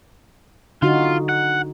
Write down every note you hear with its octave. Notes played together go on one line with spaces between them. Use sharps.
D3 D#4 F4 F#4
F#5